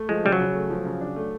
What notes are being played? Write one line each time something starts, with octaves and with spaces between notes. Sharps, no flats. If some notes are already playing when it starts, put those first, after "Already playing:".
Already playing: A3
F3 G#3
C#3 G3
F#3
C#3
A3
F3
C#3
D4
A3